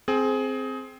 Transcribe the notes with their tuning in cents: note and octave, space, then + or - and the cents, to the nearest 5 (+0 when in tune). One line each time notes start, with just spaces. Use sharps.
C4 +0 G#4 +20